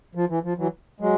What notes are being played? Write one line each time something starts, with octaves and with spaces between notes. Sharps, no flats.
F3
E3
F3
E3 F#3
F#3 G#3